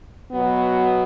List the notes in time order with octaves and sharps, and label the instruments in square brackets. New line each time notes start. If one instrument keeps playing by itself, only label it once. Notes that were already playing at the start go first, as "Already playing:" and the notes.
[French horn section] B2 F#3 B3